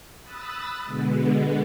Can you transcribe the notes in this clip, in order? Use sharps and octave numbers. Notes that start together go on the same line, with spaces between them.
B5 D#6 E6 F#6 A6
B2 D3 G#3 B3